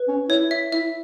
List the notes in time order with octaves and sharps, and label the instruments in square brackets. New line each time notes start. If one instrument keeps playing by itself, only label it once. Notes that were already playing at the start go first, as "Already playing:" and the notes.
Already playing: [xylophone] B4
[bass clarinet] C#4
[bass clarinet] E4 [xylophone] C#5
[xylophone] E5
[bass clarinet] E4 [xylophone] E5